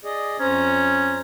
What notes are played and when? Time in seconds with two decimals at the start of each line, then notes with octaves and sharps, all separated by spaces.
0.04 G#4 D5 D#5
0.40 F2 C#4 C5 A#5